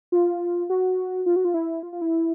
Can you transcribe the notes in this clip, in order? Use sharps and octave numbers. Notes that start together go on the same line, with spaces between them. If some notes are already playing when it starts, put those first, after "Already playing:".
F4
F#4
F4
F#4
F4
E4
F4
F4
E4